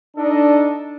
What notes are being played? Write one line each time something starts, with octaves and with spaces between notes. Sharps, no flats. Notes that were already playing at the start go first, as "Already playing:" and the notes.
D4 D#4 A4 D#5